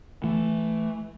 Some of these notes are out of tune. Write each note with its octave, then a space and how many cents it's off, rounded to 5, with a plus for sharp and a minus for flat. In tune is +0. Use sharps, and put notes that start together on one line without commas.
E3 +10 A3 +0